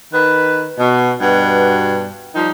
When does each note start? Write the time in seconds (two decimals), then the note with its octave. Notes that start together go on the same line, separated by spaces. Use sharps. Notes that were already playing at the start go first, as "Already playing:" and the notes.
0.13 D#3 B4
0.78 B2
1.20 G2 B2
2.35 F3 G3 D#4